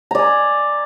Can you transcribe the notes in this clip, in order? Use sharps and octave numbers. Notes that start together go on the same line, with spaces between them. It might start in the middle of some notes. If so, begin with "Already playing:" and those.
D5 G#5 A#5